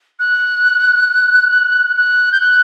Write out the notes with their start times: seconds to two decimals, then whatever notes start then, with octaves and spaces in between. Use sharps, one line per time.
0.19 F#6
1.96 F#6
2.32 G6
2.41 F#6